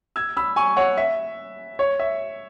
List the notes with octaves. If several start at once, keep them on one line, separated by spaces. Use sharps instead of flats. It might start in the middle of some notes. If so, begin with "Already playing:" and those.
E6 G#6
B5 E6
G#5 C#6
C#5 F#5
E5
C#5
E5